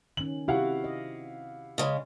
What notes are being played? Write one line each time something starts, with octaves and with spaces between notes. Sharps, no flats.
D#3 C#4 F#7
C3 E4 F#4 G4 F5 F#5
D#5
C#3 G#3